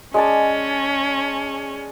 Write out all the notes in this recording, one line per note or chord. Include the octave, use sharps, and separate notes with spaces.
G#3 C#4 D5 A5